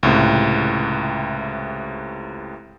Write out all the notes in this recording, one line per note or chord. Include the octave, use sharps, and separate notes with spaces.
C#2 A2 C3